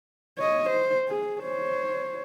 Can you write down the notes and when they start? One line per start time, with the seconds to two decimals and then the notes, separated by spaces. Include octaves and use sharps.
0.38 C#5 D#5
0.69 C5
1.08 G#4
1.42 C5 C#5